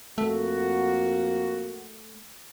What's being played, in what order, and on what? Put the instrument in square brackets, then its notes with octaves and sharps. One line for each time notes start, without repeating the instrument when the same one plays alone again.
[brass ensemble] F2 A#3 F#4 [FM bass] A3